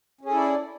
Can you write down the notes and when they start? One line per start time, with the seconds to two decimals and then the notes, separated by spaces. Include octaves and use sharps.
0.21 C#4
0.25 G#4
0.29 A4
0.33 E4
0.37 D5